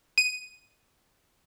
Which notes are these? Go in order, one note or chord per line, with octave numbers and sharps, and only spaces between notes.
D#7